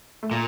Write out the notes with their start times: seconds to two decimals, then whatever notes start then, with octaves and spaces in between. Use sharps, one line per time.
0.23 A3
0.31 A#2 A#3